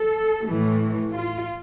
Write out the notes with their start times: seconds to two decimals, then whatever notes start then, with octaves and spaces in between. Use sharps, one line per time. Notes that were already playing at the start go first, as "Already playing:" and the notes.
Already playing: A4
0.48 A2 E3 A3
1.12 F4